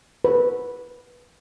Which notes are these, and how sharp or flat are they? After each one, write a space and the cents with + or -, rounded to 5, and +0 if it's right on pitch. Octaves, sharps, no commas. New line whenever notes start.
B4 -10